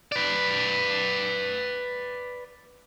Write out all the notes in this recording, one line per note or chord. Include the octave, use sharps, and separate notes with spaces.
B4 D5